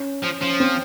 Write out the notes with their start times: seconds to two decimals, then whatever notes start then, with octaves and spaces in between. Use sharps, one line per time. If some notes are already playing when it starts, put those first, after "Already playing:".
Already playing: C#4
0.22 F3
0.41 F3 C#4
0.60 C4